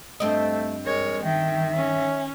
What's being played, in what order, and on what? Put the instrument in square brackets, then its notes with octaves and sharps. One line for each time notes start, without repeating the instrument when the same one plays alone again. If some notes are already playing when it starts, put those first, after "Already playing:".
[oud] G2 C4 D#5 [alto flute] A3
[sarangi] G#3 [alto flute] A#4 [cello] C#5
[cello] D#3 [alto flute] E5 [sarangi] G5
[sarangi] C#4